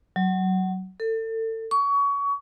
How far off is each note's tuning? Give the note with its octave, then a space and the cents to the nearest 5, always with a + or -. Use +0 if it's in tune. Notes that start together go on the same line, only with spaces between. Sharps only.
F#3 +20
A4 +30
C#6 +25